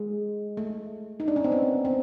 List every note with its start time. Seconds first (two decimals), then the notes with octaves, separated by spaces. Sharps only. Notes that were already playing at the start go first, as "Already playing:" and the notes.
Already playing: G#3
0.57 A3
1.20 D#4
1.28 D4
1.36 C#4
1.44 C4
1.52 B3
1.85 C4